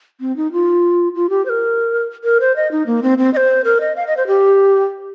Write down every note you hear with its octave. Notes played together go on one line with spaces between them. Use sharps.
C4
D#4
F4
F4
G4
C5
A#4
A#4
C5
D#5
D#4
A#3
C4
C4
D#5
C5
A#4
D#5
F5
D#5
C5
G4